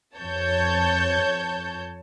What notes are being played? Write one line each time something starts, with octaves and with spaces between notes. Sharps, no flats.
F2 C#5 A5 G6